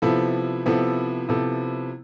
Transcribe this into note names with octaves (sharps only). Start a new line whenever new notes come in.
C3 F3 B3 E4 A4
C3 F3 B3 E4 A4
C3 F3 B3 E4 A4